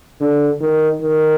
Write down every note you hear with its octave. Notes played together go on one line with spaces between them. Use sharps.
D3
D#3
D#3